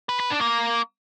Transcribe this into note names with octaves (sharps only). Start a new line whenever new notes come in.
B4
B4
D4
A#3